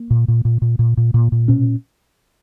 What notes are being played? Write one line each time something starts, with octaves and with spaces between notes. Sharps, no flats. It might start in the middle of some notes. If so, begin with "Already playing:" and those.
Already playing: A#3
A#2
A#2
A#2
A#2
A#2
A#2
A#2
A#2
B2 C#4